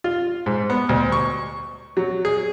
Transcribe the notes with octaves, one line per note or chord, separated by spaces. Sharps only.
F4
G#2
B3
D2
C#6
F#3
G#4